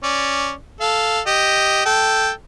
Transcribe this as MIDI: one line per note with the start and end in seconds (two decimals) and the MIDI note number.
0.04 0.52 61
0.04 0.52 74
0.81 1.19 69
0.81 1.19 77
1.27 1.84 67
1.27 1.84 75
1.85 2.30 69
1.85 2.30 79